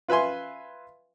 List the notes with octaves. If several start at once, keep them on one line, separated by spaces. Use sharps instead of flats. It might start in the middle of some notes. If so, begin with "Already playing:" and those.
F4 B4 E5 G#5 C6